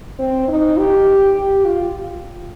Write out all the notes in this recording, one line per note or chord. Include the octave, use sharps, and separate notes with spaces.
C4
D#4
G4
G4
F4